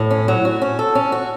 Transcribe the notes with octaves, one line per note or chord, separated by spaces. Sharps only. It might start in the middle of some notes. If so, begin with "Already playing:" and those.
Already playing: A2
C#4
F#3
F#4
C#4
A4
C#4
F#4